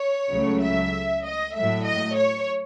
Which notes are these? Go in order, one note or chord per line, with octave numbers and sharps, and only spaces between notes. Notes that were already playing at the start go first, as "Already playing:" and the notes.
Already playing: C#5
C#2 C#3 F#3 A3
E5
D#5
A2 F#3 A3 E5
D#5
C#5